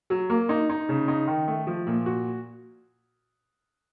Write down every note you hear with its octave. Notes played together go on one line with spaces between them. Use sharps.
F#3
A#3
D#4
D#4
C#3
D#4
D#3
A3
F3
A#2
F#4